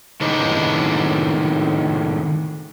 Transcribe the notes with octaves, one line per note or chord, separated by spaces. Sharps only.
A2 D#3 G#3 D4 D#4 B4